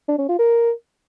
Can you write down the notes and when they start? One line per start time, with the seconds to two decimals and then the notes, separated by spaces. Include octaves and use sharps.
0.09 D4
0.19 C#4
0.29 F4
0.39 A#4